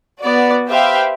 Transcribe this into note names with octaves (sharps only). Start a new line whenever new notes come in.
B3 F#4 D5
G4 B4 C5 E5 F5 G5